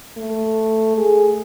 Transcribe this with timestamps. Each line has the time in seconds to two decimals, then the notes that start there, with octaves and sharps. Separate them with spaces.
0.17 A3
0.97 G#4